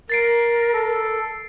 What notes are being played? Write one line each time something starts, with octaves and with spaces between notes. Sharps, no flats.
A#4 A6 C7 D7
A4